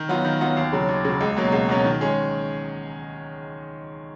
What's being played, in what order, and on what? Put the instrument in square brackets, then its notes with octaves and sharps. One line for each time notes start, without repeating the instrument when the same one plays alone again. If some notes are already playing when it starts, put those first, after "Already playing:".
Already playing: [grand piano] D#3
F#3 B3 F4
D#3
F#3 B3 F4
D#2
C#3 F#3
D#2
C#3 F#3
C#2
B2 F#3 A#3 C#4
C#2
B2 F#3 A#3 C#4
D#3
G#3 C#4 G#4